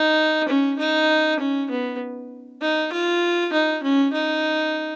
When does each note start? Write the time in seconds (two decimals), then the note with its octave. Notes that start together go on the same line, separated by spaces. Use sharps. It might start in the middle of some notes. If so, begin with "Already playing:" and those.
Already playing: D#4
0.48 C#4
0.79 D#4
1.40 C#4
1.70 B3
2.62 D#4
2.92 F4
3.53 D#4
3.83 C#4
4.14 D#4